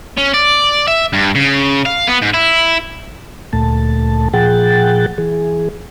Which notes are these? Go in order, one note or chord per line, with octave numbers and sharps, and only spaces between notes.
C#4
D5
E5
G2
C#3
F5
B3
G#2
E4
D2 A#2 A3 A5
A#2 F3 G#4 F#5 G5 A6
E3 G#4